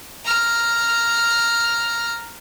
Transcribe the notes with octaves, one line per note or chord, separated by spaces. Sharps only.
A#5 F6